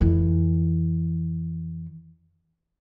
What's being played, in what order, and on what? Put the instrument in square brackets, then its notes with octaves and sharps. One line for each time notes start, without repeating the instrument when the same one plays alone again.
[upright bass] F2 E3